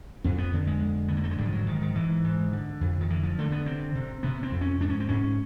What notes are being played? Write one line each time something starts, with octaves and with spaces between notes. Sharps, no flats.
F2 C4
B3
D3
G#3
F2
D3 B3
A#3
A3
G#3
G#2 G3
F3
F#3
G#2 D#3
D#3
G#2 E3
G#2
D3
F2
D#3
D3 E3
F3
D3 A3
B3
C3 C4
C3
C3 B3
C4
F2
C#4
G#2 D4
C#4
C4
G#2 C#4